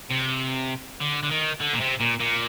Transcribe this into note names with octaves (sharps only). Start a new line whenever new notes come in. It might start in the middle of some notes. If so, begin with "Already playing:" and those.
C3
D3
D3
D#3
D3
A#2
C3
A#2
A#2